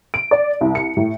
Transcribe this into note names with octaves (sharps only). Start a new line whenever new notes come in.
D7
D5
C2
C#7
A2